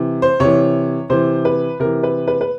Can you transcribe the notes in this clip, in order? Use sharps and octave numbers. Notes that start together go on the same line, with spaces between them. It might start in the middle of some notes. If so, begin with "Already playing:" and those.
Already playing: C3 E3
C5
C3 E3 C#5
C3 E3 C5
B4
C3 E3 A#4
B4
B4
B4